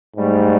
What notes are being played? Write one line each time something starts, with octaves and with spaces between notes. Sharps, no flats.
G#2 G3 A3